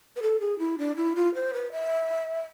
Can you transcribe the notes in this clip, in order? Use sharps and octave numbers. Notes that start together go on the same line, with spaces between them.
B4
A4
G#4
E4
D4
E4
F4
C5
B4
E5